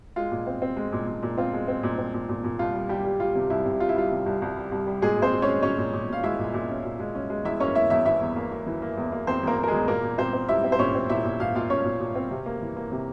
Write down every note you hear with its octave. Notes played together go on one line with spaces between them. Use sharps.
G#3 F4
A#2
C4
C4
G#3
A#2
A#2
A#2
C4 F4
G#3
C4
A#2
C4
A#2
A#2
A#2
C2 F4
G3
C2 G3 G4
G3
G3 F4
C3
C2 E4
C3
G3 F4
E4
G3 F4
C3
C2
C2
G3
C2
G3
A#2 G#3 G#4
A#2 C4 C5
A#2
C#4 C#5
G#3
A#2 C#4 C#5
A#2
A#2
A#2 F5
G#3 E4 E5
A#2
A#2
C#4
A#2
G#3
C#4
G#3
E2 E4 E5
A#3 C#4 C#5
A#3 E4 E5
E2 E4 E5
E3 E4 E5
E2
A#3
A#3
E3
A#3
E2
A#3
E2 C4 C5
E2 A#3 A#4
A#3
A#4
G#3 G#4
E2
A#2 A#3 A#4
A#2
A#2 C4 C5
C4
G3 E4 E5
C4
C5
A#2 C#4 C#5
C4
A#2 E4 E5
A#2
A#2 F5
A#2 F4 F5
A#2 C#4 C#5
A#2
A#2
C4
C3
A#3
E3
A#3
C3